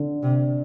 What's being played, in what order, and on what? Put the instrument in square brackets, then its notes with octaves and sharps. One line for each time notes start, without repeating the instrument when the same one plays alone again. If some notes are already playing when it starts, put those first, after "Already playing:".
Already playing: [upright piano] D3
[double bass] C3